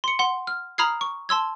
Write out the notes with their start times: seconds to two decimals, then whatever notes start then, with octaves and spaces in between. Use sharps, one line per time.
0.04 C6 C#7
0.19 F#5 C6
0.47 F6
0.78 A#5 B5 D#6 F6 G#6 C7
1.01 C#6
1.29 A5 C6 E6 G#6